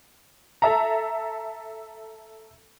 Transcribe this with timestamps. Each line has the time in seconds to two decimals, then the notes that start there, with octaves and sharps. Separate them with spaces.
0.62 A4 E5 A#5